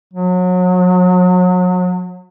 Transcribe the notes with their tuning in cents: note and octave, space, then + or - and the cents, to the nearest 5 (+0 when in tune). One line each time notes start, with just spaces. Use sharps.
F#3 -35